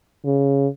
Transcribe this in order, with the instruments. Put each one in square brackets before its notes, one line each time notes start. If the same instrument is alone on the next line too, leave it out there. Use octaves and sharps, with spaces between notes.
[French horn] C#3